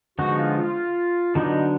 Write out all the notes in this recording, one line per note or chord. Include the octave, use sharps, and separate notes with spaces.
D3 F3 G#3 B3 D#4 F#4
F4
F4
D3 F#3 B3 D4 D#4